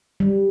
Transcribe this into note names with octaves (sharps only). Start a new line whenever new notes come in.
G3